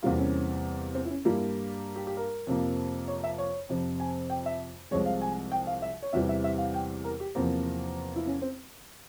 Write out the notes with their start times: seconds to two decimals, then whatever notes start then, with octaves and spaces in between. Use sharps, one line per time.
0.03 E2 C3 G3 A#3 F4
0.19 C#4
0.94 C4
1.05 E4
1.10 C#4
1.25 G2 G3 A#3 E4
1.96 G4
2.07 G4
2.17 A#4
2.47 F2 C3 F3 A#3
3.08 C#5
3.24 E5
3.38 C#5
3.69 F2 C3 F3
4.00 G#5
4.30 G5
4.46 E5
4.91 C2 C3 F3 G#3 C#5
5.06 F5
5.22 G#5
5.52 G5
5.67 F5
5.82 E5
6.03 C#5
6.13 E2 C3 E3 G3 E5
6.29 E5
6.44 E5
6.58 F5
6.74 G5
7.04 A#4
7.20 G4
7.35 E2 C3 F3 A#3 C4
8.16 E4
8.27 C#4
8.42 C4